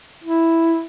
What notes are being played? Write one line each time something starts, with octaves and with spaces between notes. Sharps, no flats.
E4